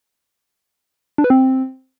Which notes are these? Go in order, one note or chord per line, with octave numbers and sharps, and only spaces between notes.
D4
B4
C4